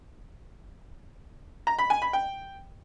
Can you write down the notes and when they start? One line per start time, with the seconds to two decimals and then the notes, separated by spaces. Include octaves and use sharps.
1.67 A#5
1.79 B5
1.90 G#5
2.02 B5
2.13 G5